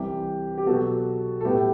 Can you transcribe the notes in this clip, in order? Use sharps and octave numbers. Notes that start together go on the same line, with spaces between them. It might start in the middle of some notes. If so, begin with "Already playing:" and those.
Already playing: C2 C3 E3 G3 G4 B4
G4
B2 F#3 B3 F#4 A4
A4
A2 G3 B3 G4 B4